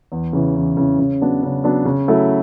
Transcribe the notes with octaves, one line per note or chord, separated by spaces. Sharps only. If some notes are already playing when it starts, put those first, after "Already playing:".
E2
C#3 E3
E2
C#3 E3
C#3
F#3 B3 D4
C#3
F#3 B3 D4
C#3
F#3 A3 E4